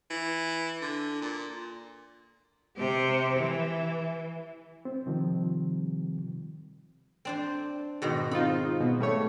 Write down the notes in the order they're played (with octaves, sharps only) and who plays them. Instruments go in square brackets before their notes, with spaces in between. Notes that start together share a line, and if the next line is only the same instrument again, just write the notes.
[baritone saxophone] E3
D3
A#2
[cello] C3 G4
E3
[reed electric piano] C4
C3 D#3 F3 G3 C4
[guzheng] C4 D4 C5
G#2 B2 D#3
[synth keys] C4 D#4 F4 [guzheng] B5
[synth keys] B2
G3 A3 C#5